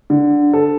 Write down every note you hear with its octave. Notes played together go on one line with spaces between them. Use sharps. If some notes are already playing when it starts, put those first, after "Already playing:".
D3
A4